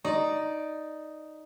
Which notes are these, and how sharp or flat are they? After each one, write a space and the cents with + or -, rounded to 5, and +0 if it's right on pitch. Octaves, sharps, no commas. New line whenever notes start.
D#4 +0 D5 +5